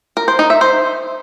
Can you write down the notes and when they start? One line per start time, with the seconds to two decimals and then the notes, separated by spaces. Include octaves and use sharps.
0.17 A#4
0.28 C5
0.39 D#4
0.50 E5
0.61 C5